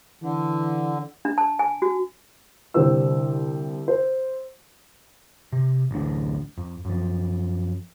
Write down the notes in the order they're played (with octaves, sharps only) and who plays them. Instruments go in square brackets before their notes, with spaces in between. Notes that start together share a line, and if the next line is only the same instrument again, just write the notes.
[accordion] D3 [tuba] E3
[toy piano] D4
A5
G#5
F#4
[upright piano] C2 D3 G4 C5 E6
C5
[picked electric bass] C3
A1 D2 D4
F2
F#2 F3